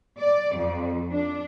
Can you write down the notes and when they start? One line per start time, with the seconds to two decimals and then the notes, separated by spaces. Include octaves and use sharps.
0.19 D5
0.56 F2
1.11 D4